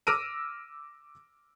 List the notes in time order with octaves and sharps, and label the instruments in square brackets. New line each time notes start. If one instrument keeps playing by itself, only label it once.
[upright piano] D6 E6 F6 A#6 D7 D#7